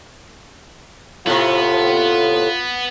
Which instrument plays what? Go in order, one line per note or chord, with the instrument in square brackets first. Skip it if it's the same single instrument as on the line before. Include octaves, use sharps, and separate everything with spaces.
[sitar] A2 C3 [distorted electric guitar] B3 [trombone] F4